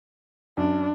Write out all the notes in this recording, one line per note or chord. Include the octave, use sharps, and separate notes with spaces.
F#2 D4